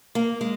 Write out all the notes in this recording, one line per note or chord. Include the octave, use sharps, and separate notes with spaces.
A#3
G#3